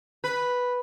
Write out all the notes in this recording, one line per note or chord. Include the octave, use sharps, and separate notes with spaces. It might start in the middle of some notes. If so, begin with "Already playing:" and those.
B4